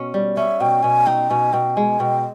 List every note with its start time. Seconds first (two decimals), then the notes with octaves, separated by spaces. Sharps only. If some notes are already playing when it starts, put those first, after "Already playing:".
Already playing: B2 C#4
0.14 G3
0.37 C#4 E5
0.60 B2 G5
0.83 B2 G#5
1.06 D#4 G5
1.30 B2 G#5
1.53 B2 G5
1.76 G#3 G#5
2.00 B2 G5